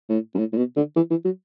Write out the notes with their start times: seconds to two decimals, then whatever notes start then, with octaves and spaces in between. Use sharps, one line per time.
0.10 A2
0.35 F#2
0.39 A2
0.53 A2
0.57 B2
0.77 D3
0.96 E3
1.11 E3
1.25 F#3